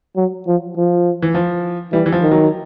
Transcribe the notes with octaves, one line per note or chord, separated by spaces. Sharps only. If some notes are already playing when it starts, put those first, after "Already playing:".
F#3
F3
F3
E3
F3
E3 G3
E3
F3
D#3
F#3